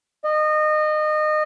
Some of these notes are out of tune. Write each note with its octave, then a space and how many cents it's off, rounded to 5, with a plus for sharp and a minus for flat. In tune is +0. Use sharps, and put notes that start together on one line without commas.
D#5 -25